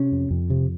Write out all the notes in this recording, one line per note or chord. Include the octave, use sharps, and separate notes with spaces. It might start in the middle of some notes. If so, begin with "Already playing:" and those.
Already playing: C3 C#4
F2
F2
C3